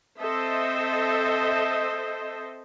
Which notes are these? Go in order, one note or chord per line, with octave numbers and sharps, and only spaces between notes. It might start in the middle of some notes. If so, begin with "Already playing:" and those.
C4 A4 C5 D#5 E5